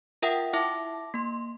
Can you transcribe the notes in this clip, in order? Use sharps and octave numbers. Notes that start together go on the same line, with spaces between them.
F4 A#4 E5 F#5 G5 D#6
E4 E5 A5 D6 A#6
A#3 C6